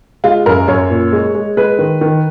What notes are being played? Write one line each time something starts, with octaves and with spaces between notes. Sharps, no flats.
G#3 F4
F#2 A#4
F#2 C#5
A#2
G#3
G#3
G#3 B4
D#3
D#3